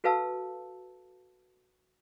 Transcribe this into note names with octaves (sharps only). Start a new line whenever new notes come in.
F#4 A4 B4 F5 A5 E6